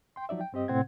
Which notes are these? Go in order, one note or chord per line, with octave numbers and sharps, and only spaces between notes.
G5 C6
F3 F#3 D#4 D5 E5
G5
G2 C4 G4 D#5
A2 C3 C4 F#5 G#6